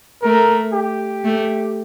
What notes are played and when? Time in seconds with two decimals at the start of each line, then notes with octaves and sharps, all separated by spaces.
0.23 A3 A#4
0.73 G4
1.24 A3